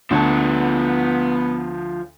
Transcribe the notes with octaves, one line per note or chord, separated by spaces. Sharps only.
D2 F3 B3 C#5 A5